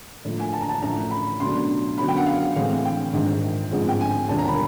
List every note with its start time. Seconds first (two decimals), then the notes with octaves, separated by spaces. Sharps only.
0.25 A2 F3 A#3
0.40 G#5
0.53 A5
0.61 A#5
0.69 A5
0.82 A1 A2 F3 A3 A#5
1.11 B5
1.40 C#2 B2 F#3 A3 D4 C6
1.98 F#2 D3 F#3 B3 B5
2.08 G5
2.17 F#5
2.26 F5
2.56 A2 E3 G#3 C4 F5
2.85 G5
3.13 A#1 G#2 D#3
3.72 A1 G#2 F3 G#3 C4
3.88 G5
4.01 G#5
4.28 E1 D#2 D3 G3 A5
4.39 A#5
4.48 B5